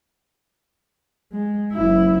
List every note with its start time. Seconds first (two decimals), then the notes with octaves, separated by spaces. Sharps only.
1.32 G#3
1.73 F#1 E4